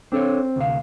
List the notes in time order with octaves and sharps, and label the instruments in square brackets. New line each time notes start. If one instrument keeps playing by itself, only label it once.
[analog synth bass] C4 [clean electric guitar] D4 A4 C#5
[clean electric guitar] D2 C3 F5